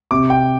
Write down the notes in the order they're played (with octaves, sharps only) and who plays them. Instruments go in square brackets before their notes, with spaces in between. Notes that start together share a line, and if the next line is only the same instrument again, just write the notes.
[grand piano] C3 D6
G5